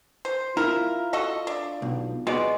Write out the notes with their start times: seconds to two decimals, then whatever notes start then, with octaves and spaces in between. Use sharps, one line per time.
0.25 C5
0.57 E4 F4 A#4
1.13 F#4 A4 D#5
1.47 D4
1.82 B1
2.27 G#3 B3 F#4 D5